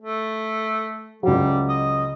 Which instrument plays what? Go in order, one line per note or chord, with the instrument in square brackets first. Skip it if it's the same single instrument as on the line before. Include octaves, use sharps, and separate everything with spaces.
[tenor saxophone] A3
[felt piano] C#2 F#3 [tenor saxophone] G3
[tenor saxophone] D#5